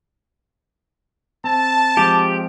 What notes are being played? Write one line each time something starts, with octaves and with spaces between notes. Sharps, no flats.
C4 A5
F3 G#3 C4 G4